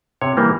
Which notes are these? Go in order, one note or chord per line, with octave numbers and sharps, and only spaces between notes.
C3 C#5
E3 G3 A#3